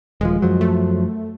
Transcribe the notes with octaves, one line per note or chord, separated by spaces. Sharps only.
D#1 F3 G#3
F#2 F3 F#3
A3